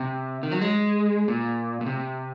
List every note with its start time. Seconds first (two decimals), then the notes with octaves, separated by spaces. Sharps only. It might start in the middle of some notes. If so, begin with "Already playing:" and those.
Already playing: C3
0.43 D#3
0.52 F#3
0.61 G#3
1.28 A#2
1.81 A#2
1.86 C3